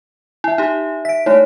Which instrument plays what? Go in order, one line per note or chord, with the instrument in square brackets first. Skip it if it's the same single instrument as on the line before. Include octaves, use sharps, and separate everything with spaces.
[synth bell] E4 [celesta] E5 G#5
[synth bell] D#4 G4
[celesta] E5 [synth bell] B6 D7
[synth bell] A3 D#4 E4 [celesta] C#5